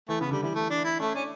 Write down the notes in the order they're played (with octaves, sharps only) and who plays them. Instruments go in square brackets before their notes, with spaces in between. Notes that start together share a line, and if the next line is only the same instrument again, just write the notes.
[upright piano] E3 [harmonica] A3
[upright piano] C#3 [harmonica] B3
[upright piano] D3 [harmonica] G3
[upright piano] E3 [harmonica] G3
[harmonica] A3
D4
E4
[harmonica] A3 [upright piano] C#4
[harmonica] C#4 [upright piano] D4